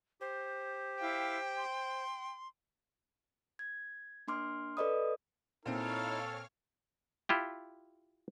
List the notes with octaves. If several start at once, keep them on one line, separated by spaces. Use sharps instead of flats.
G4 C5
E4 F5 G5
C6
G#6
A#3 D4 C6 D6 F6
A4 B4 D5 D#5 B5 D#6
A#2 C4 D#4 E4 A4 C#5 F5 F6
E4 F4 G4